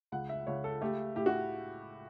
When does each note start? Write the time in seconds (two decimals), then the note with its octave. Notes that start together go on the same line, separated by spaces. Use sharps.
0.12 C#2 F#5
0.29 E5
0.47 C#2 C#5
0.64 A4
0.81 A3 G4
1.16 A2 G4
1.26 F#4